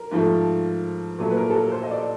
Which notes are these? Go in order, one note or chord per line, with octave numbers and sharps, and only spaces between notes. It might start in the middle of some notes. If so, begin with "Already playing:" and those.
Already playing: A#4
G#2 F3 A3
A#2 F#3 A3
B4
A#4
A4
A#4
C5
D#5
D5